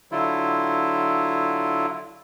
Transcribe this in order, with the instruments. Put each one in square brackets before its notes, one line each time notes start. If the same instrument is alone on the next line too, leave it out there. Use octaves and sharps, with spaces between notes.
[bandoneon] D3 F#3 E4 F4